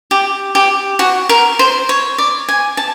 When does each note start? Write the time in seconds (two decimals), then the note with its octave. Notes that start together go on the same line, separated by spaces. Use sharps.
0.11 G4
0.55 G4
0.99 F#4
1.29 A#4
1.59 C5
1.89 C#5
2.18 D5
2.48 G#5
2.77 A5